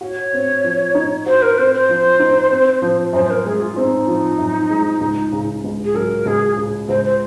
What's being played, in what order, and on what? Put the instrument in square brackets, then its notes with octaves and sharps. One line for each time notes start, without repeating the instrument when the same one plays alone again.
[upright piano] F#4 [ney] C#5
[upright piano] C4
F3
D#4
[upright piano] F#4 [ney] C5
[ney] A#4
[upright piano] C4 [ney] C5
[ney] C5
[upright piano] F3
D#4
C4
F3
[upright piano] F#2 [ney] C5
[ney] C5
A#4
[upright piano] G#3 [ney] G#4
[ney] F4
[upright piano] C4 [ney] D#4
[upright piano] F3
F#2
G#3
C#2
C#3
C#2
[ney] G#4
[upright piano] F#3 [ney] A#4
[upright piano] C#2 [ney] G#4
[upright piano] C#3
[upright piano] C#2 [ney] C5
[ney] C5